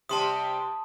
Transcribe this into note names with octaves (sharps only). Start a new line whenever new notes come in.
C3 G3 A5 C6 D#6